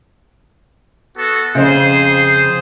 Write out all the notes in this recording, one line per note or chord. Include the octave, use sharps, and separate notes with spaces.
B3 F#4 A4
F2 C#3 G#4 C5